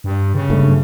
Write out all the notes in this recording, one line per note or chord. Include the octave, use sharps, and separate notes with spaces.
G2
C#3
F#1 G2 A3